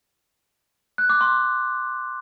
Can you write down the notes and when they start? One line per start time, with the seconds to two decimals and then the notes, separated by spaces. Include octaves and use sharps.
0.98 F#6
1.09 D6
1.21 C6